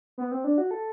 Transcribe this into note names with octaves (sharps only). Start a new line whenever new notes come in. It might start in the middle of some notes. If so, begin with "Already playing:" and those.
B3
C4
D4
F#4
A4